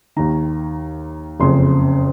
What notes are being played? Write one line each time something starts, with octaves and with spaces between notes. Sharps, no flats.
D#2 D#3 A#5
F#1 F2 C#3 C6